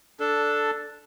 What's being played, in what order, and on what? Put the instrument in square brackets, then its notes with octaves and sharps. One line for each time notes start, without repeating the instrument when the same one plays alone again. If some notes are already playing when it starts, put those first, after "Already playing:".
[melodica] D4 A4